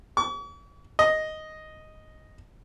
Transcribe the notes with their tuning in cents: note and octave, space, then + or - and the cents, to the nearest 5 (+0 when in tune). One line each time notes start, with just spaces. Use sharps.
C#6 +45
D#5 +0